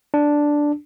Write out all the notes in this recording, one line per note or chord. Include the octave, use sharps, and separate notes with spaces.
D4